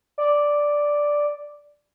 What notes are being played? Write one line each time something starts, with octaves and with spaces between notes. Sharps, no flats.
D5